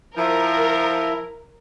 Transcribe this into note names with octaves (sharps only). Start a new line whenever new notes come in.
F3 E4 A#4